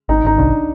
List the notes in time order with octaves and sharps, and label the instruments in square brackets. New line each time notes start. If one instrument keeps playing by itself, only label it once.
[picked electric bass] G#1 [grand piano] D#4
[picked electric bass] G#1 [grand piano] D#4
[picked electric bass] C2 [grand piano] D4